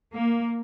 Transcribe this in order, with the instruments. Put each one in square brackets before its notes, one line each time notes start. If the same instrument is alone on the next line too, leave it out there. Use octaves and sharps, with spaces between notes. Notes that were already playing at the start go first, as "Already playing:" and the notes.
[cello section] A#3